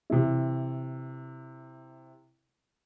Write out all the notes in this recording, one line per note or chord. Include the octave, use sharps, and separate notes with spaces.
C3 E3 E4